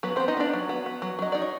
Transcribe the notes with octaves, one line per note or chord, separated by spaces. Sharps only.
F#3 B3 B4
B3 C4 C5
D#4 D#5
B3 D4 D5
F#3
B3
B3
F#3
F#3 D#5
D#4 D5
C#5